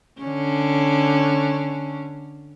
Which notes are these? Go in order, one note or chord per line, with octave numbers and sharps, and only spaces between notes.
D3 C#4